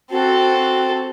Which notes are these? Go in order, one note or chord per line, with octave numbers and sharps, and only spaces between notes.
C4 F#4 A4